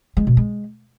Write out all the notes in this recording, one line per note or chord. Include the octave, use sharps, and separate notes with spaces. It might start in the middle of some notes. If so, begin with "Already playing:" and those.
G#3
B2
G#3